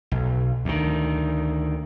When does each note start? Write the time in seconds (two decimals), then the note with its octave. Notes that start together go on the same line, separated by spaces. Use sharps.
0.11 B1
0.65 D2 D#3